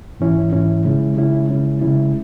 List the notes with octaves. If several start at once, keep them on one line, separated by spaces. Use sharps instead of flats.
G#2 E3 C#4 E4
G#2 E3 C#4 E4
C#3 G#3 C#4 E4
C#3 G#3 C#4 E4
C#3 G#3 C#4 E4
C#3 G#3 C#4 E4